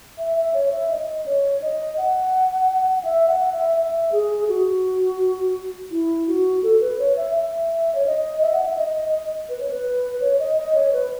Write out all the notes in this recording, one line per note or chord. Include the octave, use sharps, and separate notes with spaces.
E5
E5
C#5
E5
D#5
C#5
D#5
F#5
F#5
E5
F#5
E5
E5
G#4
F#4
E4
F#4
A4
B4
C#5
E5
E5
C#5
D#5
E5
F#5
E5
D#5
B4
C#5
B4
C#5
D#5
D#5
C#5
B4